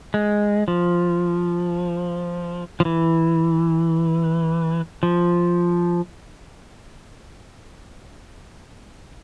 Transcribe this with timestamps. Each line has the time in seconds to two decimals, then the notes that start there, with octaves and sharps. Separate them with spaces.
0.14 G#3
0.68 F3
2.80 F3
2.85 E3
5.03 F3